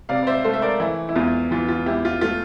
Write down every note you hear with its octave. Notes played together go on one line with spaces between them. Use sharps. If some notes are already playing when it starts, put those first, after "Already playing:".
C3 D5 F5
D5
C5 E5
A3 A4 C5
E5
A#4 D5
E3 E4
E4
E2 F4
E3 F4
F4
E2 E4 G4
F4
A3 F4